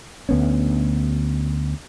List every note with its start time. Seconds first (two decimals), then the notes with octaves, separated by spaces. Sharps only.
0.29 D2 B3 C#4